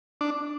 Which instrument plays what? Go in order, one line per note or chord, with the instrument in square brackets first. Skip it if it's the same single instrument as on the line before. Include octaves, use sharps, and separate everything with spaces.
[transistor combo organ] D4